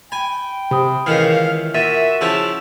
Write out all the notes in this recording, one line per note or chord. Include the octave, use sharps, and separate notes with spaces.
G5 G#5 B5
C3 B5 D#6
C#2 D#3 E3 F5 F6 C#7
A#2 F#4 E5 A6 D#7 E7
C#3 F3 E4 A5 E6